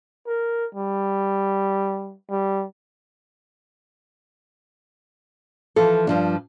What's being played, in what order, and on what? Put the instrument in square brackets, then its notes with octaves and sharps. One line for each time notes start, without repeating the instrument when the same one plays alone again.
[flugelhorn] A#4
G3
G3
[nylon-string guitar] E3 F3 A4
G2 F3 D4